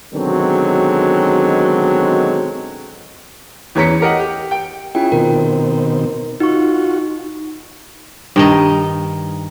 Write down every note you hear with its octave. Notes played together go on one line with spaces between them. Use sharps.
B2 D3 D#3 F#3 G#3 C4
E2 E3 C#4 A#5 B6 C#7
G4 A#4 D#5 F#5
G4
G5
C#4 E4 F4 G#4 G5
B2 D#3 C4 A#4
D#4 F4 F#4 C#6
G2 D#3 D#4